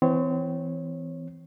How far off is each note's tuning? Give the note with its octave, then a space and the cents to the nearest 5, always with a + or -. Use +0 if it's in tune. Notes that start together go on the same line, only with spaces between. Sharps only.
E3 +0 C4 -35 C#5 -15